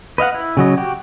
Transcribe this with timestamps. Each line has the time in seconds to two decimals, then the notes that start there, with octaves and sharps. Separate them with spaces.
0.18 B4 D#5 F5 F#5
0.34 E4
0.57 C#3 F#3 D#5
0.78 F#4 G4